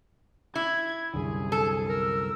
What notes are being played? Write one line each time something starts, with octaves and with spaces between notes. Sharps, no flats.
E4 G#6
C2 F#2 D3 G#4
A4
A#4 E6